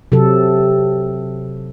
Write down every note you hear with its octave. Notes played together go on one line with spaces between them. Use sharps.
C3 F#3 A4